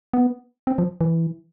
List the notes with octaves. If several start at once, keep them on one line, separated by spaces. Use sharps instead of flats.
B3
C4
F3
E3